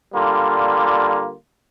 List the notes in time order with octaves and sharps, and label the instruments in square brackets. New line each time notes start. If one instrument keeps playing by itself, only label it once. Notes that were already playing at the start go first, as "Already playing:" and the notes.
[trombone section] D3 G3 A#3 F4